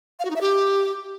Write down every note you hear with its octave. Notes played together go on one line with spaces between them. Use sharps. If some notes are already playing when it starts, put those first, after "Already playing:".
F5
F#4
D#4
E5
G4